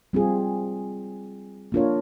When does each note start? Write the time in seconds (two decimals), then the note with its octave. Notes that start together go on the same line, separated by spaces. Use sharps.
0.13 G3 C4 F4 G#4
1.72 A#3 D4 F4 A#4 C#5